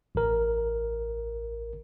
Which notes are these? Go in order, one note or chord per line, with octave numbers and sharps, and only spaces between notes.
A1 A#4